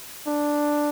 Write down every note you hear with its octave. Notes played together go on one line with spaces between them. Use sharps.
D4